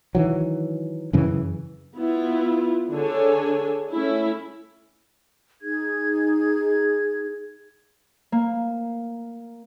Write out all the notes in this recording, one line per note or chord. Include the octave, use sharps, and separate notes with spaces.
D#3 E3 F#3
F#2 C#3 E3
B3 E4 F4
D3 D4 G#4 A4 C#5 G#5
A3 C#4 E4
D#4 G#4 G#6
A#3